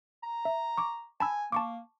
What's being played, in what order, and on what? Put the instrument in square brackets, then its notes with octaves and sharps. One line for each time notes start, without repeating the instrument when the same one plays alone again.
[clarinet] A#5
[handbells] E5
C#6 D6
[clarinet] G#5 [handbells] A5 B5 E6
[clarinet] A#3 [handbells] A5 C#6 D6